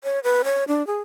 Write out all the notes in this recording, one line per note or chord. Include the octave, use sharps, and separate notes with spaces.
C#5
B4
C#5
D4
G#4